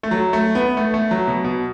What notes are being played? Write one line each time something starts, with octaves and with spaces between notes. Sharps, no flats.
A3
F#3
A3
B3
A3
A3
F#3
B2
B2